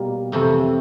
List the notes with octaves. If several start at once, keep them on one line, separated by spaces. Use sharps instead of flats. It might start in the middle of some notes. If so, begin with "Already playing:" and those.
Already playing: B2 G3 A#3
F2 C3 E3 A3